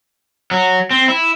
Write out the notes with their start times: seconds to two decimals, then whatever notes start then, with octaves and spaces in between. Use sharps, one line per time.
0.51 F#3
0.91 C4
1.08 E4